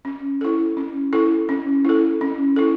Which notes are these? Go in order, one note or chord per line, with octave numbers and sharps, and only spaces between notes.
C#4
E4 A4
C#4
E4 A4
C#4
E4 A4
C#4
E4 A4